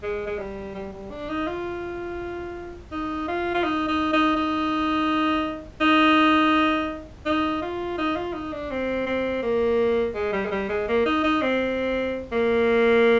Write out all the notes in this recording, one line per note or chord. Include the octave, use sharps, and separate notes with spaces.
G#3
G#3
G3
G3
G3
D4
D#4
F4
D#4
F4
F4
D#4
D#4
D#4
D#4
D#4
D#4
F4
D#4
F4
D#4
D4
C4
C4
A#3
G#3
G3
G#3
G3
G#3
A#3
D#4
D#4
C4
A#3